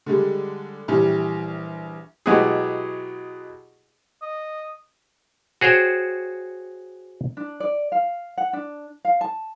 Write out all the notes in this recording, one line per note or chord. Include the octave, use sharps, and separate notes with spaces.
D3 G3 G#3
A#1 E3 G3
B2 F#3 G#3 E4 G4 G#4
D#5
F#4 G#4 C5 C#5 G5
D4
D5
F5
F#5
D4
F5
A5